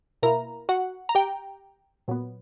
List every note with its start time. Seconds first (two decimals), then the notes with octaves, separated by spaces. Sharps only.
0.23 B2 A#3 E4 A#4 A#5
0.69 F#4 F#5
1.09 A#5
1.15 G4 G5
2.08 A#2 F#3 B3